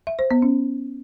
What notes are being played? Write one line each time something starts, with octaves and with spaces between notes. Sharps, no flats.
E5
C5
B3
C#4